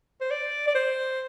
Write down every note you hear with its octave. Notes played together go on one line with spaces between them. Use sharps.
C5
D5
D5
C5